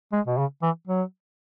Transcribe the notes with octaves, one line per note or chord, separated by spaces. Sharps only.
G#3
B2
C#3
E3
F#3